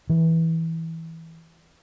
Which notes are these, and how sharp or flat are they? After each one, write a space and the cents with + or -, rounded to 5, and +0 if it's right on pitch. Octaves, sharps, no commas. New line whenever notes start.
E3 -15